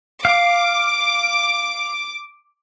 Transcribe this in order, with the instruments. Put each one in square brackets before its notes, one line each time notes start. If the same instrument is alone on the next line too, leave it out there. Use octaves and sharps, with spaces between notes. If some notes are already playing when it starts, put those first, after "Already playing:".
[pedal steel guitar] F5 [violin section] D6